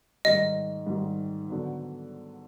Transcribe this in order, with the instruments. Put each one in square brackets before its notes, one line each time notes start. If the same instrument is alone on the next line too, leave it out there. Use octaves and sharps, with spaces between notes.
[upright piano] G#2 D#3 G3 [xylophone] D#5
[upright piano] G#2 D#3 G3
D3 F#3 B3